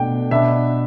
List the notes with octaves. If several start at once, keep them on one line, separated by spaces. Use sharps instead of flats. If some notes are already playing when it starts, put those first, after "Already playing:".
Already playing: B2 A3 D4 G5
B2 B3 D4 E5